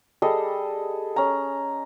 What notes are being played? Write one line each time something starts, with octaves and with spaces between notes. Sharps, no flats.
G3 G#4 A4 D#5
C#4 A#5